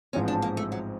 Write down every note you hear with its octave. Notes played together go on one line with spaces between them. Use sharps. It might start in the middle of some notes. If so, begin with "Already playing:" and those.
A1 G#2 F3 G#3 C4 C#4
D4
A#3
A3
F#3